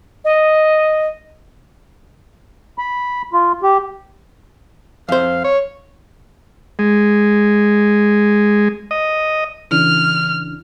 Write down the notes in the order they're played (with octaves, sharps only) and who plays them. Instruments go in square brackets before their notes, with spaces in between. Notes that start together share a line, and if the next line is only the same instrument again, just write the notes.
[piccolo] D#5
[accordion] B5
F4
G4
[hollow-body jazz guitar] F2 C5 [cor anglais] F5
[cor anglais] C#5
[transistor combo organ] G#3
D#5
[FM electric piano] C#3 E3 D4 [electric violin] F6